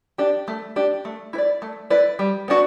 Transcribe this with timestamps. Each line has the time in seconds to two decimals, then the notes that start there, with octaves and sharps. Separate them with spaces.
0.18 D4 G4
0.48 A3
0.76 D4 G4
1.05 A3
1.33 E4 B4
1.38 D5
1.62 A3
1.90 E4 B4 D5
2.19 G3
2.48 B3 D4 F#4